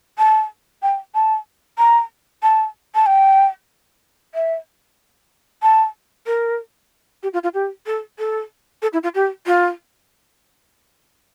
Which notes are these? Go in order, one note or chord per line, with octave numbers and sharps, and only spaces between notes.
A5
G5
A5
A#5
A5
A5
G5
E5
A5
A#4
G4
F4
F4
G4
A4
A4
A4
E4
F4
G4
F4